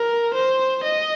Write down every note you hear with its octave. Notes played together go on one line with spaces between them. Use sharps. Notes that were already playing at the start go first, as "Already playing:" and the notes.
Already playing: A#4
C5
D#5